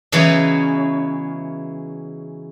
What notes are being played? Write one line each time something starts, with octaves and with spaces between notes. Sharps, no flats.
C#3 E3 F#3 G#3 B3 C#4